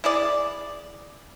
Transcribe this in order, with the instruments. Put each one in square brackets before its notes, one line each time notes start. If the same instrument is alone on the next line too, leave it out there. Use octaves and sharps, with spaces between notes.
[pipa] E4 G#4 D5